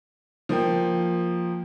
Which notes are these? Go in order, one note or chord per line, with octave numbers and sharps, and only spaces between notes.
F3 A#3 G5